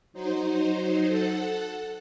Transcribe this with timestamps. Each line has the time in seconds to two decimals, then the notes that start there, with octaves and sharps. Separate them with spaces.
0.13 F#3 D#4 C5
1.06 A4 F#5